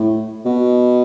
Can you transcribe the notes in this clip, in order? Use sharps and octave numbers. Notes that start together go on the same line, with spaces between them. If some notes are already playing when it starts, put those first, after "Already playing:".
Already playing: A2
B2